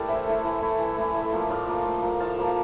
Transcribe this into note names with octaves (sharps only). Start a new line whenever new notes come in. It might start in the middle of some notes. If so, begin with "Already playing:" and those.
Already playing: A3 E4 G4 A#4 D5
E3 C5 E5
A3 E4
E3
A3 E4
E3
A3 E4
A2
F3 A#3
A2 D5 F5
F3 A#3
A2
F3 A#3
A2 F5 A5
F3 A#3